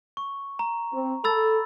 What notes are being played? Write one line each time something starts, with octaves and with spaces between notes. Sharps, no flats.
C#6
A#5
C4
A4 B5 E6 A6